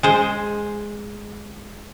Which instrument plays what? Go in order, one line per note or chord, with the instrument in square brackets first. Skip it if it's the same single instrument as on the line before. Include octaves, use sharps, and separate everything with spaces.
[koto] G#3 C5